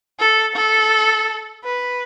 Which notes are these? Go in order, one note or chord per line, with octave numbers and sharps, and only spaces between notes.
A4
A4
B4